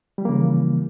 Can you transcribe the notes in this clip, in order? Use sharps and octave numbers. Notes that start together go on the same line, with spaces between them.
C#3 E3 F3 G3 A#3